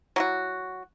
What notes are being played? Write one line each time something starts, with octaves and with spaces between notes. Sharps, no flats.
F#3 E4 F#4